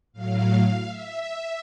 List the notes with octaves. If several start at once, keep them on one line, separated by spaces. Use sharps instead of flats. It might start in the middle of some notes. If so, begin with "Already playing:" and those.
A2 F#3 F5
E5